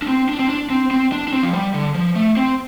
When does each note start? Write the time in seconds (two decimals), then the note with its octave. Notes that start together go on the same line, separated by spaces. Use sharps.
0.02 D4
0.08 C4
0.29 D4
0.39 C4
0.49 D4
0.70 C4
0.91 C4
1.12 D4
1.28 D4
1.33 C4
1.43 F3
1.53 G3
1.74 D3
1.95 F3
2.16 A3
2.37 C4